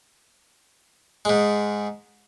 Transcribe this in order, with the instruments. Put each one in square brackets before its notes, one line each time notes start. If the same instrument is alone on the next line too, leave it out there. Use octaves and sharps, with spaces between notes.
[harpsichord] G#2 G#3